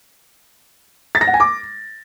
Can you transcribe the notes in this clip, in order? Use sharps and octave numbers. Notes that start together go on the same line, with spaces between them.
A6
A#6
F#5
G#5
D6